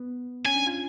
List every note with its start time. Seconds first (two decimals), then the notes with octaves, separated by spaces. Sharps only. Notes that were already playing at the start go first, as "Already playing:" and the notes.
Already playing: B3
0.46 C#4 G#5
0.55 D4
0.66 F4